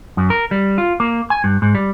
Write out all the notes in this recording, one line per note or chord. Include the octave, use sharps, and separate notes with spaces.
F#2
A#4
G3
F4
A#3
G#5
G2
G#2
G3